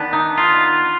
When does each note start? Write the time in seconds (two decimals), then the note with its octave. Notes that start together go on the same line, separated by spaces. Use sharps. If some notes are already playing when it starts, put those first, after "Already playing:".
Already playing: D#3 B3 D4
0.13 D#4
0.38 F4